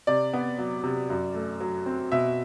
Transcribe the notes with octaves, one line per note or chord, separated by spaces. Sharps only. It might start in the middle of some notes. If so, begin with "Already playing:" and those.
C3 D5
B3
F#3
C3
F#2
A3
F#3
C4
B2 E5